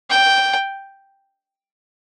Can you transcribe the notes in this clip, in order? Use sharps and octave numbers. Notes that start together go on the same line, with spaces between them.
G5